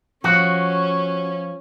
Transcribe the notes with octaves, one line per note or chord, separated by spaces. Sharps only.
F3 C#4 F#4